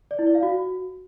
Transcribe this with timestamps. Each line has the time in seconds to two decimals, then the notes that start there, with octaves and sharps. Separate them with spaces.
0.11 D5
0.19 E4
0.27 D5
0.35 F5
0.43 F#4